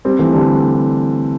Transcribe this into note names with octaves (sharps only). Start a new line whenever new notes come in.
G3 C4
E3 A3
D3 G3